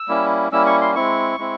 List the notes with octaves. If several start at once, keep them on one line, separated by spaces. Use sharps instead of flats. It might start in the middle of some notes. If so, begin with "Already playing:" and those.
Already playing: E6
G3 A#3 C#4 E4
G3 A#3 C#4 E4 E6
C#6
C6
G#3 C4 E4 C#6
G#3 C4 E4